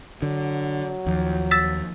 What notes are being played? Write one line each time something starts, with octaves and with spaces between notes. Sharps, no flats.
D3 F#3
D#2 F3
E6 A6 B6